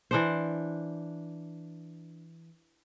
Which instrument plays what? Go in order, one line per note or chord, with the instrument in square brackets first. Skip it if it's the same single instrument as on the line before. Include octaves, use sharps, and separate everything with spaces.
[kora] E3 D4 C5